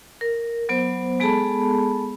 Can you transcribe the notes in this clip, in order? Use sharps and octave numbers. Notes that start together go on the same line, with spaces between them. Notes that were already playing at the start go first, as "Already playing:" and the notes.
A#4
F#3 B3 C5
G#3 B3 G#4 A4 A5 B5